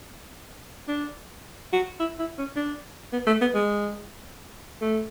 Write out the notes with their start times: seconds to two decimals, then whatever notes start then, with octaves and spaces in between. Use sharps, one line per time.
0.88 D4
1.73 F#4
2.00 E4
2.19 E4
2.38 C#4
2.56 D4
3.13 B3
3.27 A3
3.41 B3
3.54 G#3
4.81 A3